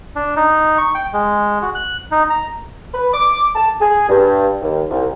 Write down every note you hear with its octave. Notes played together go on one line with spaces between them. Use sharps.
D4
D#4
C#6
G5
G#3
F#4
F#6
D#4
A#5
B4
D6
A5
G#4
G2
D#2
C2